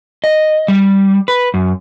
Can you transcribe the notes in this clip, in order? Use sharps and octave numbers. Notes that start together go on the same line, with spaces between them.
D#5
G3
B4
F#2